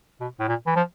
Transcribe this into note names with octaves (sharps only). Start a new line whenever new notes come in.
B2
A2
A#2
E3
F3